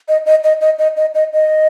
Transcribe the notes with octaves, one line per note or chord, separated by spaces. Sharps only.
D#5
D#5
D#5
D#5
D#5
D#5
D#5
D#5